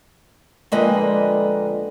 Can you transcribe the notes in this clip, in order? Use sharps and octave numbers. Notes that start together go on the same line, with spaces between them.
F2 D3 G#3 A#3 B4 D#5